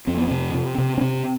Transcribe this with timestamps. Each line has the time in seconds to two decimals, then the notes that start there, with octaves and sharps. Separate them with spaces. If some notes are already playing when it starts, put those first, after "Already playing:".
0.07 F2 C4
0.17 B3
0.28 C3 C4
0.54 C3
0.78 C3
0.98 C#4
1.01 C3 C4